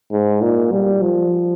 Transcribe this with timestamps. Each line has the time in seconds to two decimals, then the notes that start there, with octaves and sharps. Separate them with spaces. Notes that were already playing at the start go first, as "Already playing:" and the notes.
0.11 G#2
0.42 A#2
0.72 G3
1.02 F3